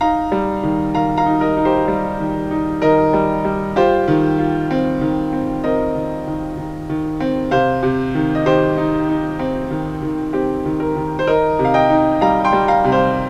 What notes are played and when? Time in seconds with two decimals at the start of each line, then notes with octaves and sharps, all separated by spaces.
0.01 D#4 F5 A#5
0.32 G3
0.63 D#3
0.94 D#3 F5 A#5
1.17 F5 A#5
1.26 D#4
1.41 A#4 D#5
1.57 D#4
1.65 G4 C5
1.88 G3
2.20 D#3
2.51 D#4
2.82 D#3 A#4 D#5
3.13 G3
3.45 G3
3.76 F4 G4 C5
4.08 D#3
4.39 F4
4.71 C4
5.01 D#3
5.33 C4
5.64 C4 A#4 D#5
5.95 D#3
6.27 D#3
6.58 D#3
6.89 D#3
7.20 C4
7.51 C3 C5 F5
7.83 C3
8.15 D#3
8.35 D#5
8.46 D#3 G4 C5
8.78 D#4
9.09 D#4
9.39 C4
9.71 D#3
10.02 D#3
10.33 C4 G4
10.65 D#3
10.80 A#4
10.96 D#3
11.19 C5
11.27 D#4 A#4 D#5
11.59 C3
11.65 F5
11.74 D#5 G5
11.90 D#4
12.21 G3 F5 A#5
12.44 G5 C6
12.53 G3
12.68 F5 A#5
12.84 C3
12.92 C5 F5